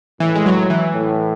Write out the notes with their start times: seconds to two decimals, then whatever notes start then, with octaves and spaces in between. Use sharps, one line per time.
0.20 A2 E3
0.35 G#3
0.46 F#3
0.70 E3
0.94 A2